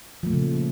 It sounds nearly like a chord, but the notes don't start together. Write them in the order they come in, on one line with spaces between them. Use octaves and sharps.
F3 A3 A#2 C#3